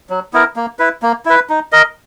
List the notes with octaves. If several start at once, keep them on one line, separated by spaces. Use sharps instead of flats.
F#3
B3 E4 A#4
A#3
E4 B4
A#3
E4 B4
D#4
A#4 D#5